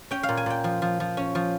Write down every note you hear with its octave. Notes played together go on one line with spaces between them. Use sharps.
C#4 G5
F5
A#2
G#5
A#2 G5
F3
F3
F3
C#4
F3